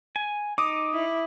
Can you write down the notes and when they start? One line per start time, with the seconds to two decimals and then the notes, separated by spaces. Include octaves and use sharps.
0.16 G#5
0.58 D#4 D6 D#6
0.94 E4